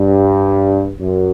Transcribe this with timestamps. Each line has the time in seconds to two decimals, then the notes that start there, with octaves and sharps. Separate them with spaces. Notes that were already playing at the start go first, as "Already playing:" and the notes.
Already playing: G2
1.00 F#2